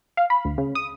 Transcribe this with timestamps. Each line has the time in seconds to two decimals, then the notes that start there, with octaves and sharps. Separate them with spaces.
0.17 F5
0.30 B5
0.45 D2
0.58 C#3
0.75 D#6